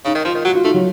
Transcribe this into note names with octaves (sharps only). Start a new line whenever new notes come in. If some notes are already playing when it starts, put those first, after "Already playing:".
C#3 D#4
D#3
F3 F4
D#3
F#3 F#4
F4
A3 D#4
F#3